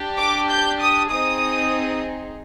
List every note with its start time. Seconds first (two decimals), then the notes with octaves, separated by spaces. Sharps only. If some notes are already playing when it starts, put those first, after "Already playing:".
Already playing: D4 G4
0.18 D6
0.49 G6
0.80 D#6
1.10 C4 D#4 G#4 D#6